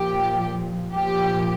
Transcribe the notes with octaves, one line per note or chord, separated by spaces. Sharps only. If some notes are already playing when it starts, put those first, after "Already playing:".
Already playing: A#2 F3 G4
A#2 F3 G4